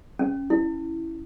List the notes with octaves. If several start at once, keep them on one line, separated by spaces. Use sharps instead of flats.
C#4
E4